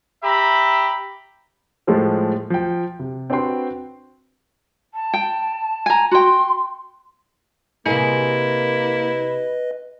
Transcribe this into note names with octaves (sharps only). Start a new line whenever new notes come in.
G4 E5 A#5 B5
A2 F3 G#3 F4 A4 C5
F3 G5
C3
C4 D4 F#4 B4 G5 C6
A5
G5
G#5 A#5
F#4 G5 C6
C3 A#3 E4 G#4 B4 D#5